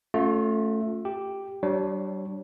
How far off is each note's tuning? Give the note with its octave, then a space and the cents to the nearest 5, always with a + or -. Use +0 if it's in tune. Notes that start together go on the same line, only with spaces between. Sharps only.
A3 +0 C#4 +0 F4 +35
G4 +0 G5 +0
G3 -40 D4 -5 C#5 -20